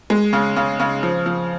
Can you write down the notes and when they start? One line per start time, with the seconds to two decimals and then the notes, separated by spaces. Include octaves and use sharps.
0.10 G#3
0.33 C#3
0.56 C#3
0.80 C#3
1.03 F3
1.26 F3